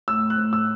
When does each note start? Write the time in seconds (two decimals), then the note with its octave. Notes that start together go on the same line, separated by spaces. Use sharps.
0.08 A2 E6
0.30 F#6
0.38 A2
0.53 E6